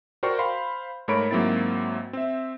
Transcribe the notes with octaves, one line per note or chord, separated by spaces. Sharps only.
F#4 A#4 C5 D5 G5 C#6
C5 F5 B5 C6
G#2 A3 A#4 C#5 B5 D7
G#2 F#3 A#3 C4 E4 A6
C4 E5